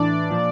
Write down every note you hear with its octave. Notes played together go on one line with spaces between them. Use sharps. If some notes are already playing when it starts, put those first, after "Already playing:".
Already playing: A2 E3 D4 D5
A#2 F3